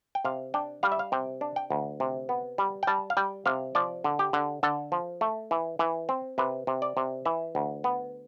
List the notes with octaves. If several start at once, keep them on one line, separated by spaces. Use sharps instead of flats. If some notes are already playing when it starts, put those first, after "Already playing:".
G5
C3 F5
D4 G5
G3 F5
E5
F5
C3 G5
D4
G5
D2
C3
B3
G3
G5
G3 A5
F5
G3 G5
C3 F5
F3 D5
D3
G4
D3
D3 A4
F3
A3
E3
E3
C4
C3 B4
C3
D5
C3
E3 E5
D2
B3